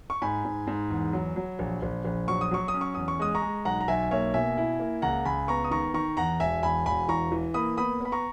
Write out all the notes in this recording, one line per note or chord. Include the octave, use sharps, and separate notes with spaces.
C#6
G#2 G#5 B5
G#2
G#2
E2
F#3
F#3
A#1
A#1
A#1
F#3 C#6
D#6
F#3 C#6
D#6
C#4
C#6
E2 D#6
C#6
G#3 D#6
A#5 C#6
G#3
B1 F#5 A#5
A#5
B1 E5 G#5
A#3 C#5 E5
B2 E5 G#5
E4
A#3
C#2 F#5 A#5
C#2 G#5 B5
B3 A#5 C#6
D#6
D#3 A#5 C#6
D#3 A#5 C#6
E2 F#5 A#5
E1 E5 G#5
E2 G#5 B5
E1 G#5 B5
E3 A#5 C#6
E3
A#3 B5 D#6
B3 B5 D#6
B3 B5
A#5 C#6